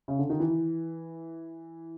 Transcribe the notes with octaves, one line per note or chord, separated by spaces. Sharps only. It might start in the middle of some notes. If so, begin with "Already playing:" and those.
C#3
D3
D#3
E3